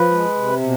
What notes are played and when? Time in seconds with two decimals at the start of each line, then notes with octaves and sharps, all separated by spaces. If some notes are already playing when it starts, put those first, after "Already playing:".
Already playing: F3 B4
0.11 G#3
0.35 C3
0.62 B2